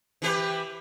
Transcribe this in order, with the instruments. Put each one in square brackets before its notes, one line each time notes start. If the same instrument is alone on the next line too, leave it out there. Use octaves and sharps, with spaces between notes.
[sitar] E3 G4 B4